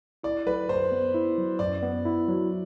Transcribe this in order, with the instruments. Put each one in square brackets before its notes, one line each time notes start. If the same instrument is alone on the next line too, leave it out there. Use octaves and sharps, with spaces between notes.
[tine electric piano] E4 [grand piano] D5
[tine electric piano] F#3 [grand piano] B4
[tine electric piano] F#2 [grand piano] C5
[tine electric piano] B3
E4
F#3
[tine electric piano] F#2 [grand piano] D5
[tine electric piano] B3
E4
F#3